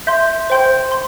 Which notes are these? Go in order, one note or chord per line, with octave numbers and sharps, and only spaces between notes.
E5 C6 G6
C5 G5 C6 G6
C6